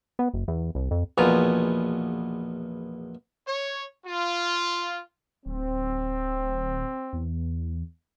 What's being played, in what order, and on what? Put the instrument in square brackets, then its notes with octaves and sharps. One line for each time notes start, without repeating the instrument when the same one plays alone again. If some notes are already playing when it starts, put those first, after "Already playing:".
[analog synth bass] B3
F#1
E2
C2
F2
[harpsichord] A#1 E2 B2 F4 A#5
[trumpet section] C#5
F4
[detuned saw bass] D1 [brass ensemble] C4
[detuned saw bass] E2